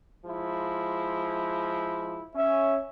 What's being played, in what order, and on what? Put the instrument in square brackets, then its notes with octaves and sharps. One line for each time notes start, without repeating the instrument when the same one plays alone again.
[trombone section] F3 G#3 E4
[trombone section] C#4 [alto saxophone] E5